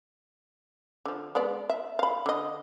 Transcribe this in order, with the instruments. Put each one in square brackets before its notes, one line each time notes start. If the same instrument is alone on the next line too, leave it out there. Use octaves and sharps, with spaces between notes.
[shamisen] D3 F3
G#3 B3 D5
E5
F5 B5
D3 D#5